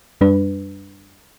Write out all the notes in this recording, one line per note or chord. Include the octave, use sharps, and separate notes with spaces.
F#2 G3 D4 B4